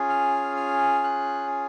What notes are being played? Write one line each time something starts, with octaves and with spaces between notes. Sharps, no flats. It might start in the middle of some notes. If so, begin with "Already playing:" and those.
Already playing: C#4 F4 G#4
F6
F6
F#6